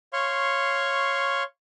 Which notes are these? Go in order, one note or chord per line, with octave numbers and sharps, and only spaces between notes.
C#5 F5 C6 C#6